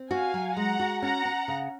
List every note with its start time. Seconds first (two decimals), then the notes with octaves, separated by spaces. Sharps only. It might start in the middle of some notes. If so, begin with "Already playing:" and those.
Already playing: C4
0.10 F#4 F5 G#5
0.34 F#3
0.56 G#3 F#5 A#5
0.80 F#4
1.02 C#4 F#5 A#5
1.25 C#4
1.48 C#3